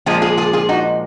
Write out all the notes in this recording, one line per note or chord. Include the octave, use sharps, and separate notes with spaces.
A#2 F3 G#3 F4 G#4
F4 G#4
F4 G#4
F4 G#4
D#4 F#4